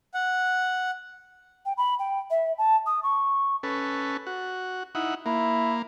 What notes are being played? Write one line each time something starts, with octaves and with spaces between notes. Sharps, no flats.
F#5
G5
B5
G5
E5
A5
D#6
C#6
C#4 A4 B4
F#4
D#4 E4 F#5
A#3 E4